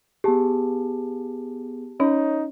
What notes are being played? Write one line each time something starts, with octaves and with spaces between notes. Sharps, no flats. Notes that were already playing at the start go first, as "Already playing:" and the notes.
B3 G4 G#4 A5
C#4 D#4 C#5